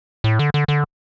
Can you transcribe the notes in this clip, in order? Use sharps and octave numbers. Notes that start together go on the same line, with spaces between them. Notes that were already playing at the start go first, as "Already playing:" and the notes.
A2
D3
D3
D3